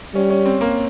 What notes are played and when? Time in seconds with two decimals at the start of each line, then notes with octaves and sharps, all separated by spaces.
0.15 G3 C#4
0.30 C#4
0.46 C4
0.61 A#3